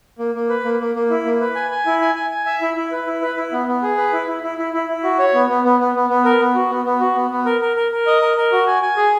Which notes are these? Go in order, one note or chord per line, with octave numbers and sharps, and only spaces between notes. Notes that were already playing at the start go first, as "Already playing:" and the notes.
A#3
A#3
B4
A#3
A#3
A#3
E4
A#3
B4
G#5
G#5
E4
G#5
G#5
G#5
E5
E4
E4
B4
E4
B4
E4
B3
B3
G#4
B4
E4
E4
E4
E4
E4
E4
F#4
C#5
B3
B3
B3
B3
B3
B3
A#4
B3
F#4
B3
B3
F#4
B3
B3
A#4
A#4
A#4
A#4
D#5
A#4
A#4
F#4
G#5
G#5
G#4